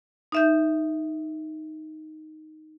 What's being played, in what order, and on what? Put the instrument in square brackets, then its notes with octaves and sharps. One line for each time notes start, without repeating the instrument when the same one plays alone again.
[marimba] D#4 E5 G6